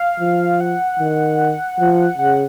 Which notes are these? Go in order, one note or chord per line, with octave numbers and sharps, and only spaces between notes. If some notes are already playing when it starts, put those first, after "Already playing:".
Already playing: F5
F3
F#5
D#3
F3
C#3 F#5